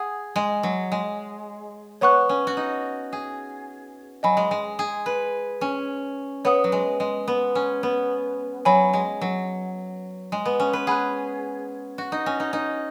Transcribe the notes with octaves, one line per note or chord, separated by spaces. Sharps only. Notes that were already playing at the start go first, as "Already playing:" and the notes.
Already playing: G#4 F#5 D#6
G#3
F#3
G#3
B3 C#5 F#5 C#6 F#6
C#4
F#4
D#4
G#4
F#3 D#5 G#5 B5
G#3
G#3
G#4
B4
C#4
B3 C#5 F#5 D#6
F#3
G#3
G#3
B3
C#4
B3
F#3 C#5 G#5 B5
G#3
F#3
G#3
B3
C#4
B4
G#4 F#5 B5 F#6
F#4
D#4
C#4
D#4
D#4